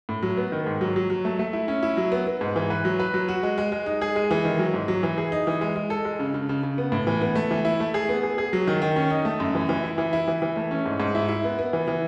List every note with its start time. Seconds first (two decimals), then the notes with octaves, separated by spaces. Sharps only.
0.09 A2
0.23 F#3
0.37 B3
0.52 D#3
0.66 G#2
0.81 F#3
0.96 F#3
1.10 F#3
1.25 A3
1.39 A3
1.53 E4
1.68 C#4
1.83 E4
1.97 F#3
2.12 B3
2.27 B3
2.41 G#2
2.56 E3
2.70 B4
2.85 F#3
3.00 B4
3.14 F#3
3.28 F#4
3.43 G#3
3.58 G#3
3.72 G#3
3.86 D#4
4.02 G#4
4.16 G#3
4.31 E3
4.45 D#3
4.59 F#3
4.74 G#2
4.88 F#3
5.03 E3
5.18 G#4
5.32 D#4
5.47 E3
5.61 G#3
5.76 G#3
5.90 A4
6.05 G#3
6.19 C#3
6.34 C#3
6.49 C#3
6.63 C#3
6.78 B3
6.92 A2
7.07 E3
7.21 B3
7.35 A3
7.51 E3
7.65 E4
7.80 A3
7.94 G#4
8.09 B3
8.23 G#4
8.38 G#4
8.53 F#3
8.67 D#3
8.82 D#3
8.96 C#4
9.10 D#4
9.25 A3
9.40 F#2
9.55 E3
9.69 E3
9.84 E4
9.98 E3
10.13 E4
10.28 E3
10.42 E3
10.56 A3
10.71 C#4
10.86 G#2
11.00 G#2
11.15 E4
11.29 E4
11.44 B3
11.59 B3
11.73 E3
11.88 E3